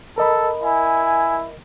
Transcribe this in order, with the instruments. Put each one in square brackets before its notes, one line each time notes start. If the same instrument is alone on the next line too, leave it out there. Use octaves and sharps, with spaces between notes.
[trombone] A4 [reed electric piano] A#4 D#5 B5
[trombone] E4 [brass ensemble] G#5